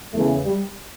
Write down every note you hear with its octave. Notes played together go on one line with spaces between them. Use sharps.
E2 C#3 E3 A3
G3